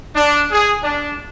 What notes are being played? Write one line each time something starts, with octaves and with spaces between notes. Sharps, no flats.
D4
G#4
D4